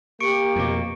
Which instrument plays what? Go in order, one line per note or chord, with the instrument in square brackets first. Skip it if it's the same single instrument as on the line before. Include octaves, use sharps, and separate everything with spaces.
[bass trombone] A#3 [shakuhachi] G4 [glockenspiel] C#6 C#7 D7
[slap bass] F2 B2